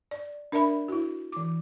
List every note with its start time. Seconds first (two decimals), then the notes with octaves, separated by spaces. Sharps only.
0.11 D5
0.52 D4 A#4 D5 E5 B5
0.88 E4 F#4
1.32 E3 D6